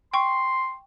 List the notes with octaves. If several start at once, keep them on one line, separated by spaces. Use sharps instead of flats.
G5 C6 C#6